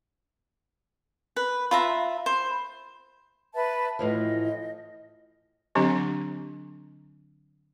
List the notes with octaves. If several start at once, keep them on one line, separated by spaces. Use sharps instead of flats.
B4
F4 E5 A#5 B5
C5
B4 E5 A5
A2 E3 F3 D#5
D3 F#3 C4 D4 G4 D#5